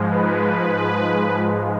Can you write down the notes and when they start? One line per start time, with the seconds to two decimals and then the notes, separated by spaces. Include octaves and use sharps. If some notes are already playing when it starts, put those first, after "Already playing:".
Already playing: G#2 F3 G#3
0.11 B4